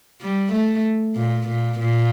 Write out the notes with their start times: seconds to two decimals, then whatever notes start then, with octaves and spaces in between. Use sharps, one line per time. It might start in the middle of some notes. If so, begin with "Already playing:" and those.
0.21 G3
0.52 A3
1.16 A#2
1.47 A#2
1.79 A#2